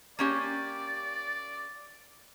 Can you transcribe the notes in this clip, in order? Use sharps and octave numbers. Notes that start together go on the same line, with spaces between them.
A#3 C#4 G4 D5